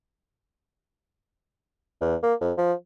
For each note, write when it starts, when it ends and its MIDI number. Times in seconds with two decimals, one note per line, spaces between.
2.01 2.15 40
2.23 2.34 58
2.41 2.53 41
2.58 2.73 53